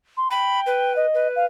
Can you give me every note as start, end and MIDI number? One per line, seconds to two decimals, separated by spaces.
0.17 0.31 84
0.31 0.93 79
0.31 0.60 83
0.66 1.06 71
0.96 1.28 75
1.14 1.46 71
1.36 1.45 77